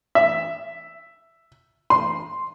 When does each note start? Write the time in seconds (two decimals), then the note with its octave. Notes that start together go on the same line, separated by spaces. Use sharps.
0.15 E5
1.90 C6